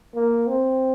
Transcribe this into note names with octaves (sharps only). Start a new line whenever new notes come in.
A#3
C4